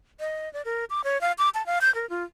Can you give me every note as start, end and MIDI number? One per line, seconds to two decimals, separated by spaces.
0.20 0.51 75
0.53 0.62 74
0.65 0.85 70
0.90 1.01 86
1.04 1.20 73
1.21 1.32 77
1.38 1.49 86
1.54 1.65 81
1.66 1.79 77
1.81 1.93 91
1.95 2.08 70
2.09 2.23 65